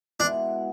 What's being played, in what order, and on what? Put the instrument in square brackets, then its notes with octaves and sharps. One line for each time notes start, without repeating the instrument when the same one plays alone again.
[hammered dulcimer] B2 G#3 B3 E4 [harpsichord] D4